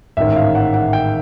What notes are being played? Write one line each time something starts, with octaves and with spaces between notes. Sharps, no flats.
A1 G#2 D#3 E5
F5
F#5
F#5
G5